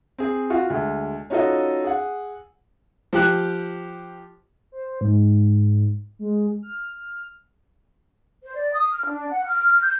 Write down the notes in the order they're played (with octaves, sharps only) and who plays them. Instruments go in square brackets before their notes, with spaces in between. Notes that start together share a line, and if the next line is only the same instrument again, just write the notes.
[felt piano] C4 G#4
F4 F#4
D2 G#3
C#4 D#4 F4 F#4 A4 D#5
G#4 F#5
[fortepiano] F3 G4 F#6
[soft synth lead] C5
G#2
G#3
F6
[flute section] C5
D5
D#6
F6
D4
F#5
F6
G6